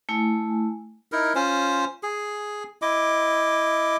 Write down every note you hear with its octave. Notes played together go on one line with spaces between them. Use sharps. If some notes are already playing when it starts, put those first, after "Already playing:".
A3 E4 G#5
D#4 E4 A#4
C#4 F4 C5
G#4
E4 D#5 D6